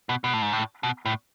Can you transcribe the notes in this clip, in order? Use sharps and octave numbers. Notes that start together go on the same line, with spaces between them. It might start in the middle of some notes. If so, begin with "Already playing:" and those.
B2
B2
A2
G#2
A2
B2
A2